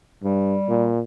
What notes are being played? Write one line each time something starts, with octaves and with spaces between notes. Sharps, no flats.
G2 G3
A#2